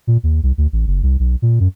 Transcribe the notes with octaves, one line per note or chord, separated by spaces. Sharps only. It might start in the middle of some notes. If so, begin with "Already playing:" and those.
A#2
D#2
C2
D2
A1
F#1
C2
B1
A#2
F#2